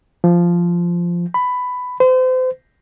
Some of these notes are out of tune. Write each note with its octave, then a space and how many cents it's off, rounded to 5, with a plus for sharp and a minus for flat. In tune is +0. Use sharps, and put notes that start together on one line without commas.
F3 -10
B5 +15
C5 -35